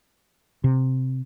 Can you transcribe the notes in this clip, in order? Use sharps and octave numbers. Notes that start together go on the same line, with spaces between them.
C3